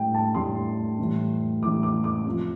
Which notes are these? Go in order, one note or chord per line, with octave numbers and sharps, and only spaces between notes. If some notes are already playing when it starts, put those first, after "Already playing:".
Already playing: A2 G3 G5
A5
A2 G3 C6
A2 E3 G3
A2 E3 G3 D6
D6
D6
C3 F3